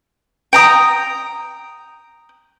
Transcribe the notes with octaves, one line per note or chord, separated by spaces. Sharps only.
G5 A#5 D#6